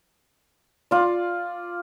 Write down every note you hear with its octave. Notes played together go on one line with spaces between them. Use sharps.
F4 D5